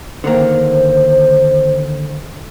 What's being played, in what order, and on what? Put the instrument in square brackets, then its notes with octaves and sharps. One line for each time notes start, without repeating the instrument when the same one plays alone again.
[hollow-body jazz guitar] D3 D#3 A#3 [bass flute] C5